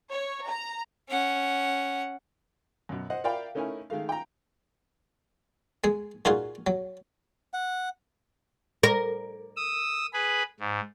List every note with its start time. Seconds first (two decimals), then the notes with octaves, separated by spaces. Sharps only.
0.11 C#5
0.45 A#5
1.09 C#4 F#5
2.89 F#2 B2
3.10 C5 D#5 F#5
3.24 A#4 D5 E5 F5 G5 B5
3.55 A3 C#4 D#4 E4 A#4 G#5
3.90 D#3 G#3 A3 F5
4.09 G5 A#5
5.84 G#3 G#4
6.25 A#2 D#4 F4 F#4 G#4
6.67 F#3
7.54 F#5
8.83 A#4
9.57 D#6 E6
10.13 G#4 B4 B5
10.60 G#2